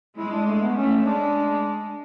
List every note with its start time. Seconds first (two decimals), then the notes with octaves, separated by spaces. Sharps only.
0.17 G#3 E4
0.31 D4
0.46 A3
0.61 B3
0.76 A3 C#4
1.05 G#3 D4